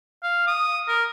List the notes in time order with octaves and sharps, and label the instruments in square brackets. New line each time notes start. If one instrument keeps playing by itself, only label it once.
[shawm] F5
D#6
A#4